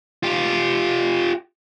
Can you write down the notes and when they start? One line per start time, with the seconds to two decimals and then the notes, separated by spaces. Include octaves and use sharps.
0.23 F4 G4